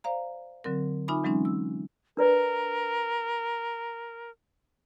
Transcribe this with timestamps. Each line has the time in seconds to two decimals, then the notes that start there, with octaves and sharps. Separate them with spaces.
0.04 C5 D5 F5 A#5
0.64 D3 F#3 C4 A#4
1.08 D#4 F4 E5 G#5 B5 D6
1.24 E3 F#3 G#3 C4 C#4 D#4
1.45 E6
2.17 D4 A#4 B4 D5